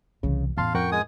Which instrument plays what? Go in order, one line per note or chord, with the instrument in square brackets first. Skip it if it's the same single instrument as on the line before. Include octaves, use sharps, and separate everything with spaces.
[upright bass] C2 E3 [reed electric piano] C#3
[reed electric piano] E2 A5 C6 [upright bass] A2 C#4 [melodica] F5
[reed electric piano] F2 A#4 F#5 [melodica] G5 C#6
[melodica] G#3 G#5 D#6